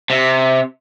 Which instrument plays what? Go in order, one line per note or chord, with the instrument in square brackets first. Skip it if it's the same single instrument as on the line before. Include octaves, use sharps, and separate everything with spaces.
[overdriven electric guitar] C3